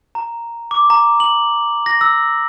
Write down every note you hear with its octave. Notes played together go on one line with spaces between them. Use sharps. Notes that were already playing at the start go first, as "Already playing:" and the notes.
A#5
D6
A#5
F#7
A#6
E6